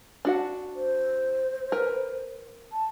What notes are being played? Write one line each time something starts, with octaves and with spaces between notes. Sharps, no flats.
D4 F#4 F#5
C5
A#4 B4
A5